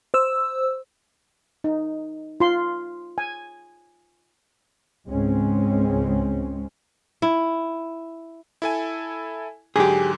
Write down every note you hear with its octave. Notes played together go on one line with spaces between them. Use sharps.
C5 E6
D#4
F4 C6
G#5
C#2 G#2 G#3 C4 C#4
E4
E4 A4 G#5
G#2 D3 F#3 G4 G#4